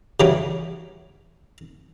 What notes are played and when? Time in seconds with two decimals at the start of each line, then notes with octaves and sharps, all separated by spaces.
0.20 C#3 E3 F#3 G3 C#4